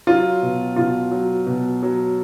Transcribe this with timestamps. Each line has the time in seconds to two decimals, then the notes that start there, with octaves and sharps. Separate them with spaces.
0.07 F#3 F4
0.42 B2
0.76 B2 F4
1.11 F#3
1.47 B2
1.83 F#3